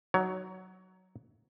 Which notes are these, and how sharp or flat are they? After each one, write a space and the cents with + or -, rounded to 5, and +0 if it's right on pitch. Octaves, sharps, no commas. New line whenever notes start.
F#3 +10 D#4 -5 C#5 +25